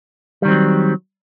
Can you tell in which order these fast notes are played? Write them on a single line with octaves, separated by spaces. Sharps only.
G3 D#3 C4 F#3